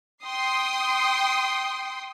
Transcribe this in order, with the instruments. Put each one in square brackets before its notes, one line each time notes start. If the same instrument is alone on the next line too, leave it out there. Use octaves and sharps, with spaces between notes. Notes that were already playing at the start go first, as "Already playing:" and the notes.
[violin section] G5 C6 D#6 C7